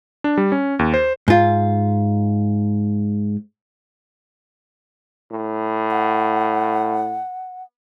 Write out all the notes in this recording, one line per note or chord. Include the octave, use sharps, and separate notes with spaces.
D4
G3
C#4
D#2
C5
G#2 F4
A2
F#5